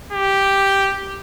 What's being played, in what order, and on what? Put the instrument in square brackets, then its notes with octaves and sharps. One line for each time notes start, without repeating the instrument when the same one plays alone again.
[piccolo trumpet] G4